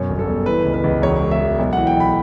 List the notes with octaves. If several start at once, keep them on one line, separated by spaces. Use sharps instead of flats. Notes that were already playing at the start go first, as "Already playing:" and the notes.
Already playing: F#2 B2 C#5
G1
A4
G1
E3 B4
C#2
B4
C#2
E1 C#5
E1
E5
E1
B1
E3 F#5
G5
B1 B5